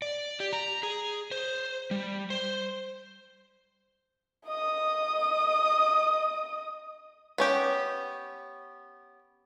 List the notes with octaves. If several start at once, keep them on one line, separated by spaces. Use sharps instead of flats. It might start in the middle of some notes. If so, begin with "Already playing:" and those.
D5
G4
A#5
G#4
C5
G3
C5
D#5 D#6
B3 C#4 G4